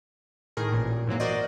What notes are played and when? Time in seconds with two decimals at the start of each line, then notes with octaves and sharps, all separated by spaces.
0.57 A2 D#3 G#4 A#4
0.72 A1 A#2
1.07 G#2 E3 F#3 A#3
1.20 F#4 A#4 C5 D5 D#5